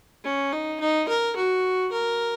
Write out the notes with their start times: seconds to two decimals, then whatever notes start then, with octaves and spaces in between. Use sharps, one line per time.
0.24 C#4
0.52 D#4
0.80 D#4
1.08 A#4
1.36 F#4
1.92 A#4